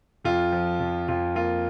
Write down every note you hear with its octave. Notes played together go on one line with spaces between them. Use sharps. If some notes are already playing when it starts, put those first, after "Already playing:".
F2 F4
F3
F2
F2 F4
A#3 F4